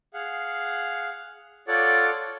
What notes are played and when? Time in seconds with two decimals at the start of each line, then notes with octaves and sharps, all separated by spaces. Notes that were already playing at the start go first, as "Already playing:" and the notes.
0.14 G#4 F5 F#5
1.68 F4 A4 C#5 D5 F#5 D6